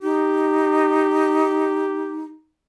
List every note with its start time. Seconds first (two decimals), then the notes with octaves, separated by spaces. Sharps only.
0.03 D#4 G4